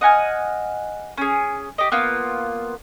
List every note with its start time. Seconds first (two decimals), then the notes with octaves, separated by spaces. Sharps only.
0.01 D#5 F#5 G#5 F6
1.18 C#4 G#4
1.78 G4 D#5
1.92 A#3 B3 F4